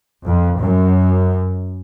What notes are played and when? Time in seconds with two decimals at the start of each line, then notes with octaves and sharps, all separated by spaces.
0.23 F2
0.59 F#2